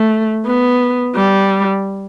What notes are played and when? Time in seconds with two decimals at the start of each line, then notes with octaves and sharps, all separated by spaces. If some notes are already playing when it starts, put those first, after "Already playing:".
Already playing: A3
0.46 B3
1.16 G3